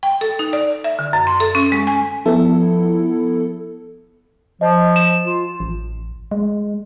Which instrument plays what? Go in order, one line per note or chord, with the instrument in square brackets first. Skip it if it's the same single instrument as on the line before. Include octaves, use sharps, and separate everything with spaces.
[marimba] G5
A4
D#4
D5
E5
D3
F#2
C6
A4
C#4
G#3
G#5
[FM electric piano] F3 B3 E4 A4
[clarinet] F3 [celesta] D#5
[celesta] E7
[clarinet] F4
[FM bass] A1
G#3